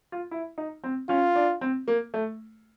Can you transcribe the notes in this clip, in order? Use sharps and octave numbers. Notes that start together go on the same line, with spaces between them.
F4
E4
D#4
C4
C#4 F4
D4
C4
A#3
A3